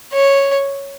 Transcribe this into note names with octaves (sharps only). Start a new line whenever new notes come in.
C#5